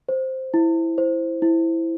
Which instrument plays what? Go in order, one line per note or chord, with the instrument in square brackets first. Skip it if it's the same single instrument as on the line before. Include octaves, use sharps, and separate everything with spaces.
[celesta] C5
E4
C5
E4